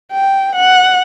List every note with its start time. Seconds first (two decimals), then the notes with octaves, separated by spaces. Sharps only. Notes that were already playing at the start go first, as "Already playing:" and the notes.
0.12 G5
0.56 F#5